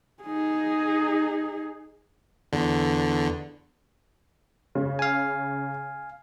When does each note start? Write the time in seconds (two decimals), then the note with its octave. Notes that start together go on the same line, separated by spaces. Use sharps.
0.23 D#4 G#4
2.53 E2 D3
4.75 C#3
4.99 F5 G#5